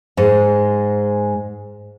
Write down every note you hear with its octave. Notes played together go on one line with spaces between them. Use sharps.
G#2 G#3